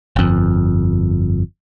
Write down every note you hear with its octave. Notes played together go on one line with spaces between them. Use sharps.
G1 F2